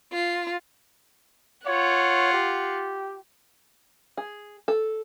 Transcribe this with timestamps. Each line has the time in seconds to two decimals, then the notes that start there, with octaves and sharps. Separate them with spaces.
0.11 F4
1.67 F4 C#5 F#5
2.33 G4
4.17 G#4
4.68 A4